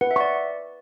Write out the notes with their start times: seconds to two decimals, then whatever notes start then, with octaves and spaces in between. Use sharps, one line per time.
0.01 B4 F#5
0.11 E5
0.16 D5 C#6